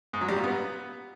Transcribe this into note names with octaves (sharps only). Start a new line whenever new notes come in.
G#2
F#3
G3
A#2
B3